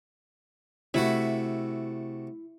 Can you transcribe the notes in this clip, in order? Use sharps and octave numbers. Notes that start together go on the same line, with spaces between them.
C3 A3 E4 F#4